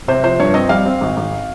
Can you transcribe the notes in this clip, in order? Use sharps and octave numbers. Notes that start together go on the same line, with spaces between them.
C3 C5
F3 C5
G2 C#5
C4 D#5
G3 F5
C4
G#1
G#1